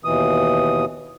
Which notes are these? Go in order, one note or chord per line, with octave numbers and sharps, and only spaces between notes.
D#2 B2 E3 D#6